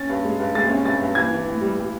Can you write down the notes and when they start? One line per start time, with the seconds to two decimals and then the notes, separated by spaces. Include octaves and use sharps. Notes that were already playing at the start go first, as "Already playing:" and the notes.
Already playing: C#4 A6
0.09 G2
0.25 G#3
0.40 G2
0.55 G#3 A6
0.69 C#4
0.85 G2 A6
1.00 G2
1.15 E3 G#6
1.31 E3
1.47 A2
1.61 G3
1.77 G3